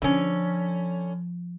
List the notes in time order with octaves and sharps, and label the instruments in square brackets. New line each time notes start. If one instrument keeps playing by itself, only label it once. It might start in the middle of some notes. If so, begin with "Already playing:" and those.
[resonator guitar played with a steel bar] D3 C#4 [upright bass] F3